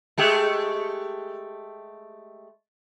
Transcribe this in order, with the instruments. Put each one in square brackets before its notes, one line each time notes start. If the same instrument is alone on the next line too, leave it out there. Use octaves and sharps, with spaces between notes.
[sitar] G#3 A3 G4